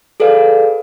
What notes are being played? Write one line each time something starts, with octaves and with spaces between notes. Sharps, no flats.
G#4 A4 B4 D5 F5